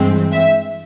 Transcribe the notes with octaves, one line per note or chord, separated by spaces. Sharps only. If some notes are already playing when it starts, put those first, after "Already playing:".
Already playing: G2 E3 G#3 C4
E5